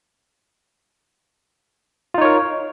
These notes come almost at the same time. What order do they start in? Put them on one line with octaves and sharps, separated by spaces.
F4 D#4 C#5 A#4